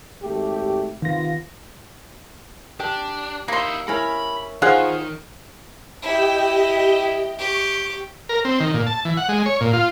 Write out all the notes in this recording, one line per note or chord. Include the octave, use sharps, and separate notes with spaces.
G#1 A3 G4
C3 D#3 B3 F4 A#6
D4 G4
A#3 D#4 E4 C6
C#4 E4 A#4 B5
D#3 F4 G#4 C5 F5 F#5
E4 G4 D#5 G5
G4 C#6
A#4
C4
D#3
A#2
A5
E3
F#5
G#3
C#5
A#2
F4